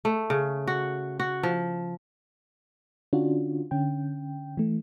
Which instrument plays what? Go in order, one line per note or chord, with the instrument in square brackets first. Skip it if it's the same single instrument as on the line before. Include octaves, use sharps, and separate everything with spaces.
[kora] A3
C#3
F#4
F#4
F3
[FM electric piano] D3 C#4 D4 F4 F#4
D3 C#4 G5
E3 A3